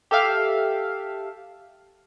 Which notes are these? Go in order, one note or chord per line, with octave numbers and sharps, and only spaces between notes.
G4 A4 E5 F5